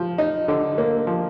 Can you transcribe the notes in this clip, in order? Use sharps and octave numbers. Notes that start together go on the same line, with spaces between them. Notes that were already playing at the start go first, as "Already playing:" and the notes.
Already playing: F3
D#4
D3
A#3
F3